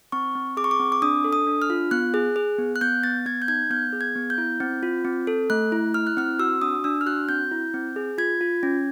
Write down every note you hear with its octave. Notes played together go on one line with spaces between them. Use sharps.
C4 C#6
C4
G#4 D6
C#6
D6
C4
D6
D4 D#6
A4
D#6
D4
F6
F4
B3 F#6
G#4
G#4
B3
F#6
B3 G6
B3 A6
B3 G#6
G6
D#4 G#6
B3 G6
G#4
G#6
B3
G6
E4
C4
F4
C4
A4
A3 F#6
E4
E4 F6
F#6
C4 F6
F#4 E6
D4 D#6
D4 E6
F6
F#4 F#6
C4 G6
E4
C4
G#4
F4 G#6
F4
C#4